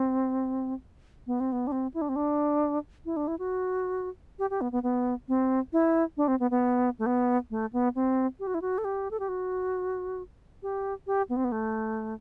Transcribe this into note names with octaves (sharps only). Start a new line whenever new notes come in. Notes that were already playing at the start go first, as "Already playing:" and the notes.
Already playing: C4
B3
C4
B3
D4
C4
E4
D4
C4
D4
E4
D4
E4
F#4
G4
G4
B3
B3
B3
C4
E4
D4
C4
B3
B3
A3
B3
A3
B3
C4
G4
F#4
E4
F#4
A4
G4
A4
G4
F#4
G4
G4
B3
C4
B3
A3